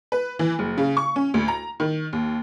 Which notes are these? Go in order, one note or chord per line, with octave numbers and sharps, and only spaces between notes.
B4
E3
F#1
C#3
C#6
C#4
D2
A#5
D#3
D#2